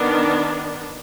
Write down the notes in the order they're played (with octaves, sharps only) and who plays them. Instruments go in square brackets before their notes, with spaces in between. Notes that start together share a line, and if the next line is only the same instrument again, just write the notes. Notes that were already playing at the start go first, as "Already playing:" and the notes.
Already playing: [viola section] D#3 B3 D4